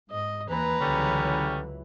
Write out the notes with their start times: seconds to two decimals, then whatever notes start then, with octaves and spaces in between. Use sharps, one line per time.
0.11 G#2 D#5
0.49 D#2 E3 B4 A#5
0.80 C#2 D3 E3 F#3 G3 C#4